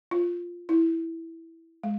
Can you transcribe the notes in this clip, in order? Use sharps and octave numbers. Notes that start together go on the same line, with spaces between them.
F4
E4
G#3